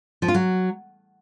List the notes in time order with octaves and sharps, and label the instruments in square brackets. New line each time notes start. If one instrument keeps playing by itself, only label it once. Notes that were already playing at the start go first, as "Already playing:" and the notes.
[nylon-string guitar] F3
F4
F#3